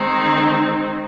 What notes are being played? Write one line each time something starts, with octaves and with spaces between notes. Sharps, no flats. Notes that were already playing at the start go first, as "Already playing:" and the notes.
Already playing: D#3 G#3 C4 D#4